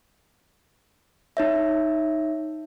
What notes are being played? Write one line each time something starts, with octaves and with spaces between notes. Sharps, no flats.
D#4 C#5 E5